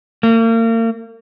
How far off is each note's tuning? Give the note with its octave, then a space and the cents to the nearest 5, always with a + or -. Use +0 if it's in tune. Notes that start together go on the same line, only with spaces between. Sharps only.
A#3 -40